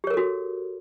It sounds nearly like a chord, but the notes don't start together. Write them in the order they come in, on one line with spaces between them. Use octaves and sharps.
G4 C#5 A#4 A4 F#4